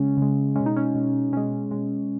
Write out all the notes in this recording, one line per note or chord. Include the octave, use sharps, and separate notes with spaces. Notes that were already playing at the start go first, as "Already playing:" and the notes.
Already playing: C#3 G#3 C#4
C#3 G#3
B2 G#3 C#4
D#4
C#4
B2 G#3
B2 G#3 C#4
B2 G#3